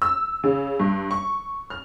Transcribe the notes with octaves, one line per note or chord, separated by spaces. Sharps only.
E6
C#3
G2
C#6
F6